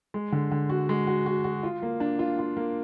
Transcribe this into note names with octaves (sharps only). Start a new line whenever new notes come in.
G#3
D3
D3
F#4
G#3
F#4
F#4
F#4
F4
A#3
D4
F4
F4
A#3